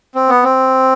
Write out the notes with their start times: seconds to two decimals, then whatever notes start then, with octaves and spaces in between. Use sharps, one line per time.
0.15 C4
0.29 B3
0.44 C4